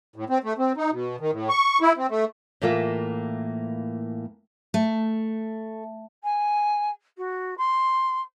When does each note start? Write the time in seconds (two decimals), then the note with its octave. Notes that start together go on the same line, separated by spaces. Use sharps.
0.16 A2
0.30 C4
0.44 A3
0.59 C4
0.77 D#4
0.92 B2
1.20 D#3
1.32 A2
1.49 C#6
1.81 E4
1.97 C4
2.10 A3
2.62 A2 E3 A#3 F4 E5
4.74 A3
6.23 G#5
7.17 F#4
7.58 C6